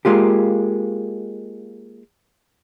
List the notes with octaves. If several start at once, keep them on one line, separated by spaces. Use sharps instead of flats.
G#3 A#3 F4 G4